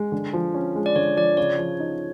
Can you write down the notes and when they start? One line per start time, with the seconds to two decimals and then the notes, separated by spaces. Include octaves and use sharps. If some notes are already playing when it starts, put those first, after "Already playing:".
Already playing: G#3
0.12 D3
0.33 F3
0.54 C#4
0.75 G#3
0.86 D5
0.96 D3 C#5
1.16 F3 D5
1.37 C#3 C#5
1.58 F3
1.80 D#4